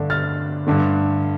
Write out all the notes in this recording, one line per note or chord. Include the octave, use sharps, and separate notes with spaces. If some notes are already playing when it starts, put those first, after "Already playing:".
Already playing: G2 D3 A3 D4
F6 A6
G2 D3 A3